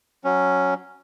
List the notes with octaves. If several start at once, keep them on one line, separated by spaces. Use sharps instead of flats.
F#3 C#4